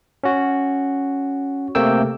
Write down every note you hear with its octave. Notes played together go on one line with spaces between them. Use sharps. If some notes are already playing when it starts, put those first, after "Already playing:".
C#4 F#4
C3 A3 A#3 G5 E6